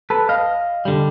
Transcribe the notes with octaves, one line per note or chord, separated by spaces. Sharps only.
A4 B4
D#5 F5
D3 G3